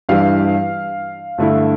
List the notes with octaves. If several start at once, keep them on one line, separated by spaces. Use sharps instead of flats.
G2 E3 G3 F5
G2 D3 A3 E4